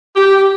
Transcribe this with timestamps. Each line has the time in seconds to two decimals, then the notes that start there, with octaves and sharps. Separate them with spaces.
0.16 G4